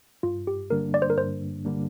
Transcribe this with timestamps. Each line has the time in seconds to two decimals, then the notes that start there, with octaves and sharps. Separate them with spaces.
0.23 G2 F4
0.47 G4
0.70 D3 G3 A#3 D4 A#4
0.94 D5
1.02 C5
1.10 A#4
1.17 G2 C5
1.65 D3 G3 A#3 D4